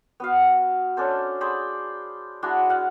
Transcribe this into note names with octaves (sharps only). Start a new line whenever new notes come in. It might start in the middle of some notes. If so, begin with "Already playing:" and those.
B3 F#4 F5
C#4 D4 A4 C5
G#4 C5 D5 B5
G#3 D4 E4 F#4
F5 F#5